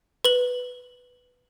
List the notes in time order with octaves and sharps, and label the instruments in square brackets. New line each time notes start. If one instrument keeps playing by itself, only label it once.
[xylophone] B4 F#7